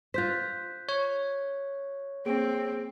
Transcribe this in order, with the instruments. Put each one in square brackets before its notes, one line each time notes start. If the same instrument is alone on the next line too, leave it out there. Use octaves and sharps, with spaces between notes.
[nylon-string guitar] F4 C5 [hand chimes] F#6 G6 B6
[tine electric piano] C#5
[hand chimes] A#3 G#4 D7 [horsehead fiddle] C4